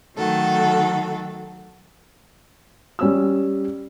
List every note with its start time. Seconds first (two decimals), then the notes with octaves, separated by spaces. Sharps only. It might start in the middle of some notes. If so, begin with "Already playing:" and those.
0.16 D#3 F#3 A3 F#4 A4
2.99 G3 C#4 E6